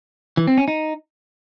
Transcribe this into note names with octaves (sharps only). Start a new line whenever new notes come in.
E3
C4
C#4
D#4